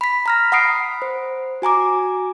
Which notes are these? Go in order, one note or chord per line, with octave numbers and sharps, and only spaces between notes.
B5 B6
A#5 F6 A#6
F#5 B5 D#6 C7 D7
C5
F#4 G#5 A#5 D6